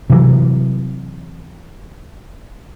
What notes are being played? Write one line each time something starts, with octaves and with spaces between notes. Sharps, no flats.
C3 E3 F#3